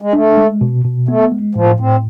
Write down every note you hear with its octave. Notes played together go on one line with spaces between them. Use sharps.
G#3
A3 D4
G#3
B2
B2
A3 B3
G#3
A2 F3
A2 C4